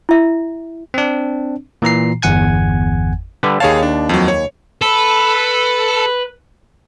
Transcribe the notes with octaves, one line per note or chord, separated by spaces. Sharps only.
E4 E5
C4 D4
A#2 E3 A#5 C7
G1 E2 F#5 G#5 G#6
D3 G3 B4
D#2 G#4 C#5 F5 A5
D4
F2 F#3
C#5
A4 B4